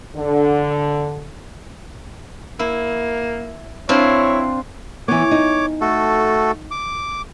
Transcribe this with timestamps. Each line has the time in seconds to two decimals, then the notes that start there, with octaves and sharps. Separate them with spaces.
0.16 D3
2.59 A#3 E4
3.89 C4 D4 E4 F4 C#5
5.08 E3 B3 C#5 D6
5.31 D#4
5.81 A3 F#4 A4
6.71 D6